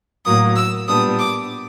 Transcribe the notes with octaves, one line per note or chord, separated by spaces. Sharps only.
A2 F#3 A#3 D#6
E6
A#2 G3 B3 D4 D#6
D6